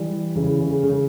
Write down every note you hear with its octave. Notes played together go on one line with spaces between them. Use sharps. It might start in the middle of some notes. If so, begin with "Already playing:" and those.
Already playing: E3 G3
C#3 E3
C#3
C#3